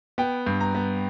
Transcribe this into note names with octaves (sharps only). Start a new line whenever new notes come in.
B3 G5
G2
A#5
B3